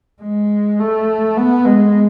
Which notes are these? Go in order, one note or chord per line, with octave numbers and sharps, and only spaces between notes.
G#3
A3
B3
G#3